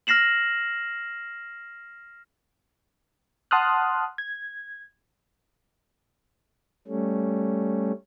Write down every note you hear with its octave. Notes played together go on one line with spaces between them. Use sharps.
F6 A#6 C7 E7 F#7
F#5 A5 C6 D#6 F6 F#6
G#6
G3 A3 C#4